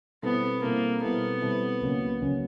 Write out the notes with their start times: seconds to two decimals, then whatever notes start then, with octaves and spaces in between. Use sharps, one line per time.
0.23 B2 G3 B3 C4 E4 A4
0.63 B2 G3 A#3 C4 E4 A4
1.02 B2 G3 B3 C4 E4 A4
1.42 B2 G3 C4 E4 A4
1.82 C#2 C#3 F#3 A#3 C#4
2.21 C#2 C#3 F#3 A#3 C#4